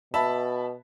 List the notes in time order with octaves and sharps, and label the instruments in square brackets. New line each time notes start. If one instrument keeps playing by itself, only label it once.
[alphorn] B2 [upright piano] E5 A5 B5